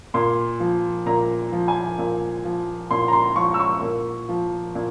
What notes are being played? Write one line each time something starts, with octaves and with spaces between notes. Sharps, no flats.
A#2 C6
F3
A#2 A#5
F3
G#5
A#2
F3
A#2 C6
A#5
C6
F3 C#6
E6
C#6
A#2
F3
A#2